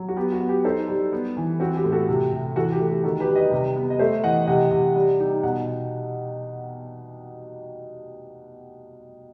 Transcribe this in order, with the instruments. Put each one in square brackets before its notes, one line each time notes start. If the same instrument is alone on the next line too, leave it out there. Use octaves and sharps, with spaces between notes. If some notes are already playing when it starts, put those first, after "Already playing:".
Already playing: [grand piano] F#3
F#4
B3 G4
F#4
B3
G4
D#4 A4 C5
G3
B3
E3
C4 F#4
G4
A2
F#4 A4
C3
C3
E3 F#4 A4
G4
A3
G4
D#3 F#4 A4
G4 B4
G3
B4 D#5
C3
B3
D#5
A3 C5 E5
E3 D#5 F#5
C3 D#5 F#5
C3
G3
D#4
B2 F#5